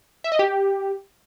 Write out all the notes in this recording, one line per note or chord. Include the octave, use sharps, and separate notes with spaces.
E5
D#5
G4